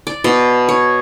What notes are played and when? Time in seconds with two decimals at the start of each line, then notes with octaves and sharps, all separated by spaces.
0.07 D5
0.24 B2
0.69 C#5